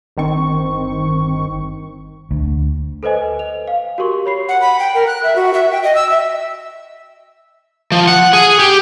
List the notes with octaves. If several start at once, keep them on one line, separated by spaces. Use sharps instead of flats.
G1 D#3 C4 C#6
D2
A4 B4 C5 D#5 G#5
F7
F5
F#4 G4 A#4 C6 C#6
C#5 B5 C7
F#5
B5
G5
A#4
F#6
E5
F#4
E5
G5
D#5
E6
E5
F3
F#5
G#4
G4